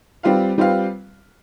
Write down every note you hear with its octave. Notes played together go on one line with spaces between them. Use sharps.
G3 C4 F4 B4 F5
G3 C4 F4 B4 F5